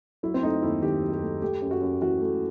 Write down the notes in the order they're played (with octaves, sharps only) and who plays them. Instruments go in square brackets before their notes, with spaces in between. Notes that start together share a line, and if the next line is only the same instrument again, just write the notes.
[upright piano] F#3 E4
C4
A3 D#4
D#2 E4
D#3 G4
F#3
G4
A3
A3 G4
F#2
F#4
F#2
E3 F#4
A3